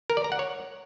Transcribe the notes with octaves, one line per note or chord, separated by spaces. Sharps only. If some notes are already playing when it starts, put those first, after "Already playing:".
A#4
D5
A#5
F#5
C#5